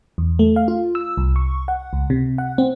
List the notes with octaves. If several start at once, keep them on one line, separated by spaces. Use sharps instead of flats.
E2
A3
F5
F4
E6
C2
C#6
F#5
C#2
C3
F#5
C4